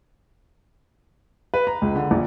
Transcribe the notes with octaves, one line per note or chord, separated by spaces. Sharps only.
B4
A#5
C#2
D3
A#1